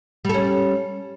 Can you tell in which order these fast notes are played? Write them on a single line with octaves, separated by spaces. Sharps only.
G3 A4 C#4